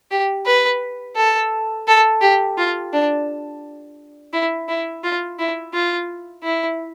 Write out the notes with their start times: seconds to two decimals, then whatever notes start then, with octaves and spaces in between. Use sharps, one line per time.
0.11 G4
0.46 B4
1.16 A4
1.88 A4
2.22 G4
2.58 F4
2.93 D4
4.33 E4
4.68 E4
5.03 F4
5.39 E4
5.74 F4
6.44 E4